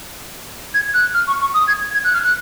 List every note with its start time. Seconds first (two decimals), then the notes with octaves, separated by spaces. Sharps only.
0.74 G#6
0.94 F#6
1.14 F6
1.27 C#6
1.41 C#6
1.54 D#6
1.68 G#6
1.94 G#6
2.04 F#6
2.14 F6
2.24 F#6